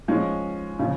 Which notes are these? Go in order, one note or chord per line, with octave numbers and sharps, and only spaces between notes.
F3 G#3 C#4
C#3 F3